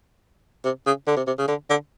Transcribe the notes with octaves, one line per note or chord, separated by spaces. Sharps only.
C3
C#3
D3
C3
C3
C#3
D3
D3